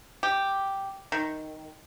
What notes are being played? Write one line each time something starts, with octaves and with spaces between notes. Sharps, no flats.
G4
D#3